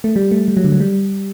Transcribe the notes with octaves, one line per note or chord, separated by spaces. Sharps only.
A3
G3
A3
G3
F#3
D3
F#3
G3